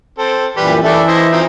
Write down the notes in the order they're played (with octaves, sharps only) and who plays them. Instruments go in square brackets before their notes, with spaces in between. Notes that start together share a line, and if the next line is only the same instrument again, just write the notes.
[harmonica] C4 A4
[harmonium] F#2 A#2 E3 [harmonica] G3 G4 B4
[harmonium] E3 E5 [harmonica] A3 D4 A4
[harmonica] E4 C5 D#5
F3 C4 D#4